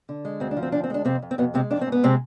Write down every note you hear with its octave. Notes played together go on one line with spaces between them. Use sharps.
D3
G#3
D2 C4
D4
F3
C4
D2 D4
C4
G#3 D4
F2 C3 C4
F2
C4
F2 B2 B3
C3 G#3 C4
F2 D4
C4
G#2
B3
C3 G#3 C4